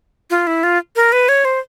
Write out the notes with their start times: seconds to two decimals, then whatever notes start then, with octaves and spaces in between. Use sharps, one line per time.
0.30 F4
0.47 E4
0.63 F4
0.96 A#4
1.12 B4
1.29 C#5
1.45 C5